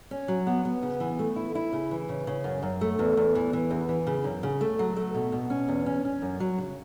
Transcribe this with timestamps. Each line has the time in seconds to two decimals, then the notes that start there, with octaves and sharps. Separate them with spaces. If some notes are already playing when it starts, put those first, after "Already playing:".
0.11 C#4
0.28 F#3
0.47 B3
0.65 B3
0.82 C#3
1.00 E3
1.19 A3
1.36 E4
1.55 E4
1.73 C#3
1.91 E3
2.09 C#3
2.27 C#3
2.44 F#2
2.63 F#2
2.81 A3
2.99 E2
3.17 E2
3.35 E3
3.53 E3
3.70 E2
3.89 E3
4.07 C#3
4.24 F#2
4.43 C#3
4.61 A3
4.79 F#3
4.96 A3
5.14 B2
5.32 B2
5.50 C#4
5.69 E2
5.86 C#4
6.05 C#4
6.22 F#2
6.40 F#3
6.58 C#3